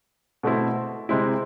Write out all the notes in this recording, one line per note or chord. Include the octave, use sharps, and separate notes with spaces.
B2 A3 C4 E4
C3 G#3 C4 E4